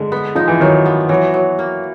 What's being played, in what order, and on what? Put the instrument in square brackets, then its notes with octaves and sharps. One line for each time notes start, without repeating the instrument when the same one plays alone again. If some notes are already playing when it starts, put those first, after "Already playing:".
Already playing: [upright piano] D3 [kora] G#3
[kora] B3
[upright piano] F3 [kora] D#4
[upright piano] E3
[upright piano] D#3 [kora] F#3
[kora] B3
[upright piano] E3 [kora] F#3
[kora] F#3
A#3